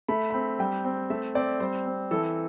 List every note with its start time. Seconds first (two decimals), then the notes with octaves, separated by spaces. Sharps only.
0.08 A3 B5
0.30 C4 B5
0.59 G3 G5
0.84 C4
1.10 A3 E5
1.35 C4 D5
1.60 G3 C5
1.86 C4
2.11 E3 A4